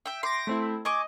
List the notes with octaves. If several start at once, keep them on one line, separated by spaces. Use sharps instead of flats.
E5 G5
G5 C6 D6 A#6
A3 C4 E4
D#5 G#5 C#6 D6